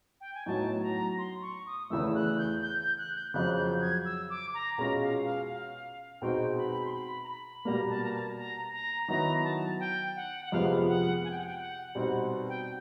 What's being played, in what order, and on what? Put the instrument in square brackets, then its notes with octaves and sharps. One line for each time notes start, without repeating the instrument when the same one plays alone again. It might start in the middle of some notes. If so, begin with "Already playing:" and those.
[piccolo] G5
G#5
[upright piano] A2 F#3 B3 D#4 F#4 [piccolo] A5
[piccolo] A#5
C6
C#6
D#6
[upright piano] E2 C#3 E3 A3 [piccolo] E6
[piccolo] F#6
G6
G6
G6
F#6
G6
[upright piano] F2 C#3 F#3 [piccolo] F#6
[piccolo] G6
G#6
E6
D6
A#5
[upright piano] B2 G#3 C#4 F4 [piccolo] A#5
[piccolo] F5
F5
F5
[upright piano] B2 G#3 C4 D#4 F#4 [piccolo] G5
[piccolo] B5
C6
B5
A#5
B5
[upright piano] B2 G3 A#3 [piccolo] A#5
[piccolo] A5
A#5
A5
A#5
A#5
[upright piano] D#3 F#3 B3 E4 [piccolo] A#5
[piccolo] A5
G5
F#5
F#5
[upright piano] F2 C3 F3 G#3 B3 [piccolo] F5
[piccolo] F#5
G#5
G5
F#5
G5
F#5
[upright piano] B2 G3 C4 D#4 [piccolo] F#5
[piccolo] G5